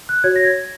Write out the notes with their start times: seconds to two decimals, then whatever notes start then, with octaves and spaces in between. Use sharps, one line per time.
0.09 F#6
0.24 F#4 C#5 G#6
0.36 A#6
0.44 G#6